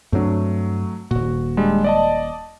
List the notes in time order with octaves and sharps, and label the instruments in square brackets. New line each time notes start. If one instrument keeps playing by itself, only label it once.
[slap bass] G2 C4 D4 [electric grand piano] F#3 A3
[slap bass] D#1 A#2 [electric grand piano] F#4
[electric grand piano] G3 G#3 D4
D5 D#5 A5